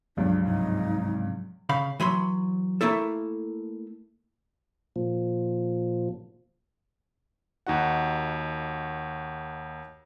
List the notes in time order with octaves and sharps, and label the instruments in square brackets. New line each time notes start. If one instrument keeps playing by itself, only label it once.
[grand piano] C#2 G2 [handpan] F3 F#3 [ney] D4
[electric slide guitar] G#2 C3 [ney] D#4
[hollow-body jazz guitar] C#3 F5 B5
E3 F#3 B5 C6
A3 A#3 E4 A4
[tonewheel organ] A#2 F3
[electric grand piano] D#2 D#4 F#4 F#5